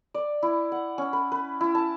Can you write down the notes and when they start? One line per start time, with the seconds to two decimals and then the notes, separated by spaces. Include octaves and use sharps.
0.14 D5
0.43 E4
0.72 F#5
0.98 C#4
1.13 B4
1.32 B4
1.61 E4
1.75 A5